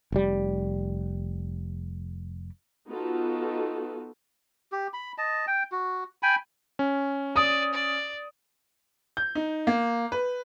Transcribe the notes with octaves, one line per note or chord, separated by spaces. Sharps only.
F1 G3
B3 D#4 F4 F#4 A4
G4
B5
D#5 A5
G5
F#4
G5 G#5 B5
C#4
D5 D#6
D5
G6
D#4
A#3
B4